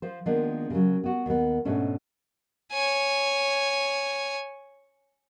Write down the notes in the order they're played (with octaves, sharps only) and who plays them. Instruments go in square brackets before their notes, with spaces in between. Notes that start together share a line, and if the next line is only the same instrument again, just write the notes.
[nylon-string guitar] F3 C5
D#3 F3 G#3 A#3 B3 D4
C#3 F#3
B3 F#4
D#2 B3
G#2 B2 A3 C#4 D4
[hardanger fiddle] C#5 G#5